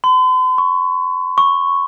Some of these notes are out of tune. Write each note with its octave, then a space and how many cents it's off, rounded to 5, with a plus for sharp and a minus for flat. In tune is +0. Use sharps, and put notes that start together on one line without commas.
C6 -45
C#6 +0
C#6 -5